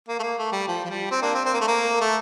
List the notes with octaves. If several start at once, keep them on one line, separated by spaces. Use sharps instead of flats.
A#3
A3
A#3
A3
G3
F3
F3
G3
C4
A#3 D4
C4
C4
A#3
A3
A#3
A3